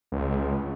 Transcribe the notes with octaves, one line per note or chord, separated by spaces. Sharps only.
C#2